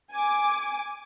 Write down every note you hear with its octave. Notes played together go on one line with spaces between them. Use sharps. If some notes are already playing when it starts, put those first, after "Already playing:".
G#5 D6